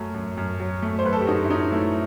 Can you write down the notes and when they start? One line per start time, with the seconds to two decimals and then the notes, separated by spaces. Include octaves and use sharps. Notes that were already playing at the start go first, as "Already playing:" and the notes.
Already playing: F#2 F#3 A3
0.15 F#2
0.37 F#2
0.60 F#3
0.83 A3
0.99 C5
1.05 F#2 B4
1.13 A4
1.21 G4
1.27 F#2 D#4 F#4
1.45 E4
1.50 F#3 D#4
1.72 A3 E4